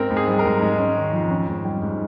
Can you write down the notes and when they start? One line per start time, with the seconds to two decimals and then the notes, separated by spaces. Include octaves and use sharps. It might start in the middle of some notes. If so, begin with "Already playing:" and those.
Already playing: G#2 C4 A#4
0.11 G#2
0.17 G#4
0.28 G3
0.39 A#4
0.45 G#2
0.62 G#3
0.79 C#4
0.96 D#3
1.13 F2
1.30 C#4
1.48 G#2
1.65 G3
1.82 G#2